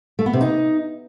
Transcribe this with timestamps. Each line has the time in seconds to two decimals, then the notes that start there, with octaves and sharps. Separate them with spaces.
0.19 A3
0.26 B3
0.33 C3
0.41 D#4